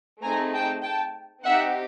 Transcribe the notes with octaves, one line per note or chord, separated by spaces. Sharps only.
A3 C4 D#4 G#4 G#5 A#5
G5 A5
G5 A5
C4 D#4 G4 E5 F#5